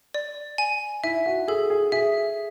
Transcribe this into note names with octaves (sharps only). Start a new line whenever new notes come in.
D5
G#5
E4 E5
F#4
G#4 A4
G#4
G#4 E5